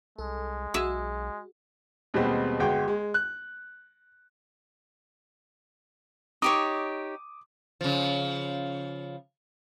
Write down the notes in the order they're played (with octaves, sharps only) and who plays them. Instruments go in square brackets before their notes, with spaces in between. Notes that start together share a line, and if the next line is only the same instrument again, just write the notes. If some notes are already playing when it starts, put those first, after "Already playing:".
[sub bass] C2 [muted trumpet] G#3 [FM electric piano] A4
[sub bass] B1 [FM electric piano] F#4 [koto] G#4 E5
[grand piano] D#2 B2 G3 G#3 B3 C4
G1 G#3 F#4 G5
G#3
F#6
[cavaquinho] D#4 G4 C#5 [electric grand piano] D6 D#6
[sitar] C#3 F3